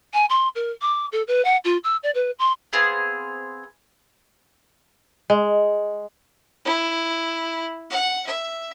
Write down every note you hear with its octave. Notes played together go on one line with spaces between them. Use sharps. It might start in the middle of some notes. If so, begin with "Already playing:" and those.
G#5
C6
A#4
D6
A4
B4
F#5
F4
E6
D5
B4
C6
B3 C4 G#4 F5
G#3
E4
F#5
E5